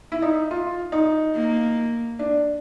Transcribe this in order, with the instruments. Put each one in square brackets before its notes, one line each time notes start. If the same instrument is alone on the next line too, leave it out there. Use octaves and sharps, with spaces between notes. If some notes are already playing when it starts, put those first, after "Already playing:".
[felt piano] E4
D#4
F4
D#4
[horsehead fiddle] A#3
[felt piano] D4